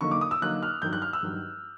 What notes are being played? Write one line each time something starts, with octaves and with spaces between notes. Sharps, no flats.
D3 F#3 A#3 D#4 C#6
D6
D#6
E6
D3 F#3 A#3 D#4 F#6
F6
G2 D#3 F#3 G6
F#6
F6
E6
G2 D#3 F#3